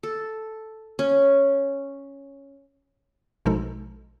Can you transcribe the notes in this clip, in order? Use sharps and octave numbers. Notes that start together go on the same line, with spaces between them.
A4
C#4
A#1 B2 F3 G#3 D#4 A4